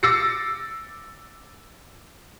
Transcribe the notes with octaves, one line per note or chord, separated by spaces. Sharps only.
D6 E6 A6 A#6 C7 C#7